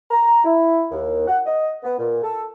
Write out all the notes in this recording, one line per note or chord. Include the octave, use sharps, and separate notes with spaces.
A#5
E4
D#2
F#5
D#5
B3
A#2
A4